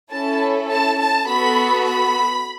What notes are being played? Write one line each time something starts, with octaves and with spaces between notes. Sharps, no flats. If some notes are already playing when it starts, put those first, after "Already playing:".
C#4 E4 A4 A5
A5
A5
B3 F#4 A4 B5
B5